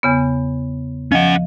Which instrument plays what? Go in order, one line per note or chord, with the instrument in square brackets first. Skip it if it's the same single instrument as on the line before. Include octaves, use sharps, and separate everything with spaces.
[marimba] E2 C#3 B3
[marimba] F3 D#5 [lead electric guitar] C#4 F#5